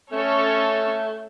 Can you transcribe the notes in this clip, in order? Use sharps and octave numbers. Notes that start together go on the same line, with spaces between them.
A3 C#4 A4 C#5